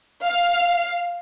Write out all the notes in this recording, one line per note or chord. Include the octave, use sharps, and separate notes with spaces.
F5